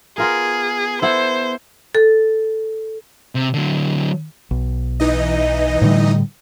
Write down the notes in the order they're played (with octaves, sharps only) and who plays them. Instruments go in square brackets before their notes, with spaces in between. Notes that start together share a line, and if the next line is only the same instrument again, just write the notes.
[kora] B3 F4 A#4 [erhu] G#4
[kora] B3 E4 A4 [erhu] C5
[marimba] A4
[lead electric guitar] C3
D3 F#3
[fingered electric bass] B1
[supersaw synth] E3 D#4 D#5
[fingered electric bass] A2 D3 G3